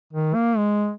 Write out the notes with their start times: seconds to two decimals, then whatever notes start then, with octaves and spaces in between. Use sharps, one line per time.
0.13 D#3
0.34 A#3
0.57 G#3